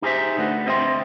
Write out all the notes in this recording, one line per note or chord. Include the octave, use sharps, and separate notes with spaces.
D#4 G4 G#4 A#4 C5 E5
D3 A3 F#4 B4
C4 C5 D#5 E5 G5 C6